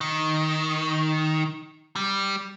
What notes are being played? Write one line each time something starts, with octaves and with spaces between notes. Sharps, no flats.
D#3
G3